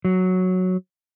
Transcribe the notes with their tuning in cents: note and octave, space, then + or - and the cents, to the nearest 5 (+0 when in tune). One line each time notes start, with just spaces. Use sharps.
F#3 -5